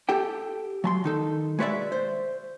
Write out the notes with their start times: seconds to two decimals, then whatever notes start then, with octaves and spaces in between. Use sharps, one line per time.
0.09 G4 A4 G5
0.84 F#3 A5 C6
1.04 D#3 D#4 A4
1.59 G#3 F#4 B4 C5 D5 E5
1.92 C5